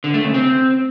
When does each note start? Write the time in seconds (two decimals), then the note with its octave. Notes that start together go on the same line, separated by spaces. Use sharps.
0.04 D3
0.14 A3
0.24 C#3
0.34 C4